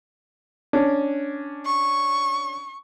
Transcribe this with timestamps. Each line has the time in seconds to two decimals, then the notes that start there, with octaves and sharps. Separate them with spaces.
0.73 C#4 D4
1.66 C#6